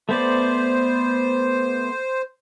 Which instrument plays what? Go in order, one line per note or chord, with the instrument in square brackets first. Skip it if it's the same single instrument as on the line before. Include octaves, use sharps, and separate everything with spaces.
[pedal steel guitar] A3 B3 D5 [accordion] C5